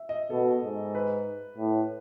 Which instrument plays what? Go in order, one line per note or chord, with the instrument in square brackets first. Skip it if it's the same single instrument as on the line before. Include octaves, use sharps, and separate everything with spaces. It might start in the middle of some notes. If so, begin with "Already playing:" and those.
Already playing: [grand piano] E5
D#5
[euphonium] B2 [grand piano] A4
[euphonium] G#2
[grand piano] B4
[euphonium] A2